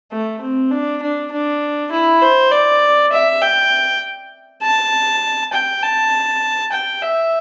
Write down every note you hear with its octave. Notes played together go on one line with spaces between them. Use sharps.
A3
C4
D4
D4
D4
E4
C5
D5
E5
G5
A5
G5
A5
G5
E5